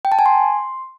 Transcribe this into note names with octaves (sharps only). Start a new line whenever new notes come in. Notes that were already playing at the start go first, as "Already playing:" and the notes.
G5
A5
G#5
C6